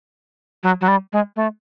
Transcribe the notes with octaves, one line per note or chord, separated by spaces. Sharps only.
F#3
F#3
G3
G#3
A3